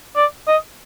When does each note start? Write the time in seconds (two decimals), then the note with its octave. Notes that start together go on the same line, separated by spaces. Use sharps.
0.16 D5
0.47 D#5